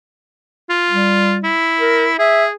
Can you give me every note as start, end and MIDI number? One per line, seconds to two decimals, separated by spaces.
0.70 1.35 65
0.90 1.52 55
1.44 2.17 64
1.80 2.07 70
2.19 2.52 68
2.19 2.45 76